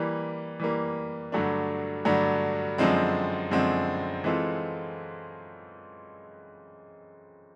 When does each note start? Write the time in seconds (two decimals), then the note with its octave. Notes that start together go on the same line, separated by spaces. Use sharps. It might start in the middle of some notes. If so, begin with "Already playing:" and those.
Already playing: E3 G3 A#3
0.60 E3 G3 A#3
1.32 G2 D3 F#3 A3 D4
2.05 G2 D3 F#3 A3 D4
2.78 F#2 D3 F3 G#3 C4
3.51 F#2 D3 F3 G#3 C4
4.24 E3 G#3 C4 F4 A4